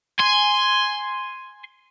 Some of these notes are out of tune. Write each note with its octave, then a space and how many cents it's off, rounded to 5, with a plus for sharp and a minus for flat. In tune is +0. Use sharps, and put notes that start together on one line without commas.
G#5 +0 C6 +0